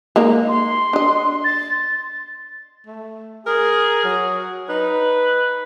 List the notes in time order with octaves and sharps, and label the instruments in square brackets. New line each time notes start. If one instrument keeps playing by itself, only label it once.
[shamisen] G#3 A#3 D#4
[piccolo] C6
[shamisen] D4 D#5
[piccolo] A6
[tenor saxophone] A3
[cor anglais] G#4 [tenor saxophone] A#4
[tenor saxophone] F#3
[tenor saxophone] D#4 [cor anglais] B4